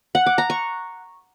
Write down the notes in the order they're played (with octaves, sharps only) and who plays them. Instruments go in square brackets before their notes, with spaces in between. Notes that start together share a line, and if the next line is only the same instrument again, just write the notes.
[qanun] F#5
D6
A#5
C#6